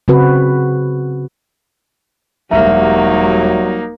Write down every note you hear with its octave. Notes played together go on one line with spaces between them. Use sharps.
C#3 C4 F#4 B4
E1 F#3 G3 A#3 D#4 E5 A#5